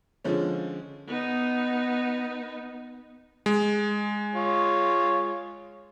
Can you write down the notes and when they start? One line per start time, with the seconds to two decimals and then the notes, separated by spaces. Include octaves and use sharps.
0.24 D3 F3 G#3 C#4
1.07 B3 D#4
3.46 G#3
4.35 F4 C#5